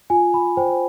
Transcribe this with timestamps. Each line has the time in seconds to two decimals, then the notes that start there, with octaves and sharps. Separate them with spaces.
0.10 F4 G#5
0.34 B5
0.57 C5 G5